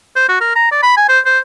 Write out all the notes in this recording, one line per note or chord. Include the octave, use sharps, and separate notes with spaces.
C5
F#4
A#4
A#5
D5
B5
G#5
C5
C5